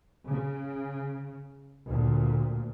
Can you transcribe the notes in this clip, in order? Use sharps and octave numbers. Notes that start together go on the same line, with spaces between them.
C#3
D2 A#2